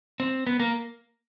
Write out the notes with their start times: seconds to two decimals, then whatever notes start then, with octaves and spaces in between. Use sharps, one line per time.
0.20 C4
0.47 B3
0.60 A#3